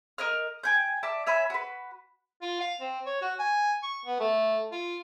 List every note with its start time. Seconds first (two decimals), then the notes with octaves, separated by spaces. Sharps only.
0.18 A#4 D#5 F6
0.63 G5 G#5 G6
1.03 D5 E5 A5
1.26 C#5 E5 G#5 B5
1.50 F#4 B4
2.42 F4
2.61 F5
2.81 C4
3.06 C#5
3.22 F#4
3.39 G#5
3.83 C#6
4.06 B3
4.20 A3
4.72 F4